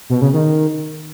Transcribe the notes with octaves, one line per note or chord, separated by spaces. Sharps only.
B2
C#3
D#3